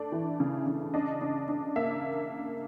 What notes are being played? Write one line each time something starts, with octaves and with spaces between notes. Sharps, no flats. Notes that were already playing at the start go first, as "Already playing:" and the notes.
Already playing: A3 D4 D5
E3
C#3
C#3
D4 D#5
D4
D4
A#3 E5